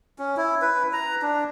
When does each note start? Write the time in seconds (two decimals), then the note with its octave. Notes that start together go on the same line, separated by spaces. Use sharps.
0.19 C#4
0.37 E4
0.62 B4
0.93 A#5
1.22 D4